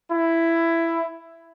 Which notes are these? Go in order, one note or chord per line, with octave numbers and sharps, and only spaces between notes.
E4